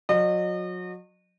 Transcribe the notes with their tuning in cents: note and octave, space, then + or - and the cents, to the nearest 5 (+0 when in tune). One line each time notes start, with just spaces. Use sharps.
F#3 -30 D#5 -35